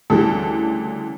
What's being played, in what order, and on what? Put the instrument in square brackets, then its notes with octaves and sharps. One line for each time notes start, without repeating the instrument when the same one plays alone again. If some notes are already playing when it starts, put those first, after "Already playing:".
[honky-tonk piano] D2 C#3 E3 G3 A4